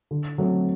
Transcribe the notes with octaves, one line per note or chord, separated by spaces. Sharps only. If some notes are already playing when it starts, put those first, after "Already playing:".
D3
F#3 A3 C4